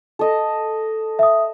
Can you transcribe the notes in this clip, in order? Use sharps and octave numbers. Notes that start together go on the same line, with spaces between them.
A4 D#5
E5 D#6